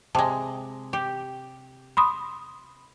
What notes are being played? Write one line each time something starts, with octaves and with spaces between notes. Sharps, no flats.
C3 G#3 A5
G4
B5 C6 D#6